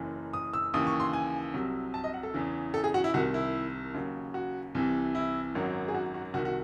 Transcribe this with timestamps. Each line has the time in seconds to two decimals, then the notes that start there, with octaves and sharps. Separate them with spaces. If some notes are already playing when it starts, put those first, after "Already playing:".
Already playing: F#1 F#2 E3
0.33 D#6
0.53 E6
0.74 D#2 C#3 E3 D#6
0.87 C#6
1.00 C6
1.13 G#5
1.54 C2 C3 F#3
1.94 A5
2.04 D#5
2.14 F#5
2.23 A4
2.34 E2 C#3 E3
2.74 A4
2.84 G#4
2.94 F#4
3.04 E4
3.14 C2 C3 D#3 F#4
3.34 E4
3.94 D#2 C#3 F#3
4.34 F#4
4.75 C2 C3 E3
5.15 E4
5.55 G#1 F#2 D#3 F#3
5.88 G#4
5.94 F#4
6.14 F#4
6.34 C2 C3 D#3 F#4
6.45 F#4